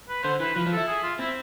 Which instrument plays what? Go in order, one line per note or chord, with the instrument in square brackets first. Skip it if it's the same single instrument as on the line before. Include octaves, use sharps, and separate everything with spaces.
[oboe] B4
[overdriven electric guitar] D3 [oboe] C5
[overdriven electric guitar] E3 [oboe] B4
[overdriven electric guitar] F3 [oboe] B4
[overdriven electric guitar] F3
[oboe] A4
[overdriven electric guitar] E4
[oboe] G#4
F4
[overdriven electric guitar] C4 [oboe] E4